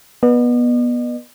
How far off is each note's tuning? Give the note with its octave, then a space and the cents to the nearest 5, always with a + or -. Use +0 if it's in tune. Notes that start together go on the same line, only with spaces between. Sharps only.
B3 -20 D#5 -45